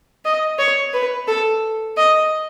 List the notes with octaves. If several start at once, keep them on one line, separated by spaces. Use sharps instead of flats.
D#5
C#5
B4
A4
D#5